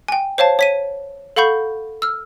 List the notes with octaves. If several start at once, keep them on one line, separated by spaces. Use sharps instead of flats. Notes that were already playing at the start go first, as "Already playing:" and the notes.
G5 G#5
C5 C#5 F5 A5
C#5 B6 D#7
A4 F5 F#5 B5 C#6 G6
E6 F6